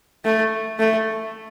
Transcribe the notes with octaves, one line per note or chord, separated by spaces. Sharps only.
A3
A3